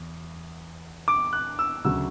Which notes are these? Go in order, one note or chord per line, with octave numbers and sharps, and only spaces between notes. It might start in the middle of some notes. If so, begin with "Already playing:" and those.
Already playing: E2
D6
F#6
E6
D2 C#3 F#3 E6